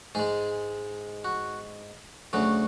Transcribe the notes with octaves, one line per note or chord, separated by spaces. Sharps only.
G#2 G#3 G#4
F#4
D2 C#3 F#3 F#4